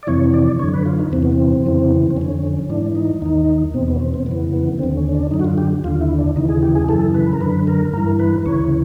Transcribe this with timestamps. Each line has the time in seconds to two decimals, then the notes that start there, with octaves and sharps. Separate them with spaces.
0.03 D5
0.07 F2 C3 E3 C#5
0.34 D5
0.59 F#2 D3 C#5
0.74 B4
0.86 F4
0.99 D#4
1.12 E2 C3 E3 C4
1.23 B3
1.33 C4
1.65 F2 C#3 E3
2.11 C4
2.17 F2 D3 C#4
2.69 G#2 E3 D4
2.95 D#4
3.21 D#2 D#3 D#4
3.74 E2 B2 C4
3.88 B3
3.96 C#4
4.00 C4
4.14 C4
4.26 F2 C#3 E3 B3
4.53 B3
4.79 D#2 D3 C4
4.97 C#4
5.08 C#4
5.15 D4
5.31 F#2 D3 D#4
5.39 F#4
5.44 F4
5.58 G4
5.84 D#2 D3 F4
6.01 E4
6.19 D4
6.36 D#2 C#3 E3 D#4
6.49 G#4
6.63 G4
6.75 G#4
6.89 F#2 C#3 E3 A4
7.14 B4
7.33 A#4
7.41 F#2 D3 B4
7.67 A#4
7.93 G2 E3 A#4
8.19 B4
8.46 D2 C#3 E3 C#5